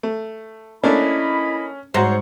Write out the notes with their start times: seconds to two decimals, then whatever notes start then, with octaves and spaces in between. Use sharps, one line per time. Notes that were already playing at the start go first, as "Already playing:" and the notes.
0.03 A3
0.84 A3 A#3 C#4 D4 E4 D#5 B5
1.94 G#2 F#4 C5 C#5 A#5 C6